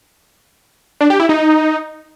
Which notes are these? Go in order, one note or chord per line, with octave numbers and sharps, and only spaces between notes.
D4
G4
E4
D#4